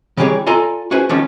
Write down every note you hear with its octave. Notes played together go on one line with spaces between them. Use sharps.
D#3 E3 G3 G4 G#4 C#5
F4 A4 D5 G#5 A#5 C6
C#4 F#4 G#4 B4 C5 G#5
D#3 F3 G3 A#3 B3 C#4